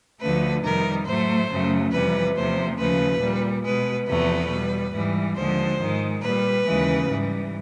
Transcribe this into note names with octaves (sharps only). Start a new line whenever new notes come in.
D2 D3 F3 A3 B4
F2 C3 D#3 G3 A#4
A2 F#3 A3 C5
F#2 C#3 F#3 A3
F2 C3 E3 G3 B4
E2 C3 F3 A3 C5
D#2 C#3 F3 A3 B4
A#2 G3
B2 G#3 B4
E2 C3 F3 A3 B4
B2 G3
G#2 E3 G3
D#2 D3 F3 G#3 C5
G#2 D#3 G#3
A#2 G3 B4
D#2 C#3 E3 G#3
G#2 E3 G3